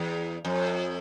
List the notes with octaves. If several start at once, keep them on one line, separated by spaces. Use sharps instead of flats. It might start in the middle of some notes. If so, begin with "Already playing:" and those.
Already playing: E2
F2